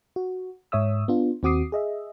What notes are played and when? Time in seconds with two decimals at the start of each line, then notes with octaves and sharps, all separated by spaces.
0.16 F#4
0.72 G#2 C#5 E5 D#6 E6
1.08 B3 D4 F4
1.43 D#2 C4 F#4 D6 D#6 C7
1.72 G#4 D#5 E5